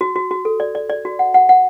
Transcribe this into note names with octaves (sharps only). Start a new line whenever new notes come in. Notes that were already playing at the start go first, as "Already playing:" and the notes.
F#4
F#4
F#4
A4
D5
D5
D5
F#4
F#5
F#5
F#5